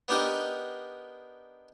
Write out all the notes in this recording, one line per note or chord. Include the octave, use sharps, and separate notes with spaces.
B3 D4 D#4 G4 A#4 D#5